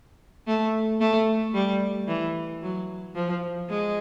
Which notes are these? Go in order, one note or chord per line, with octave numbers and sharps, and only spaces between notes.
A3
A3
G3
E3
F#3
F3
G#3